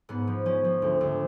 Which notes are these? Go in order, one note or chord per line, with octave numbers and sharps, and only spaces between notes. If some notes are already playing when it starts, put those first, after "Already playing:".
G#2 B3
F3
F3 C#4
F3
D2
D2